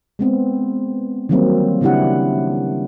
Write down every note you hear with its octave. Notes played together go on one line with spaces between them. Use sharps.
G#3 B3 C4
D#3 E3 F#3 G3 A#3 C4
C#3 C4 D4 E4 G4 F#5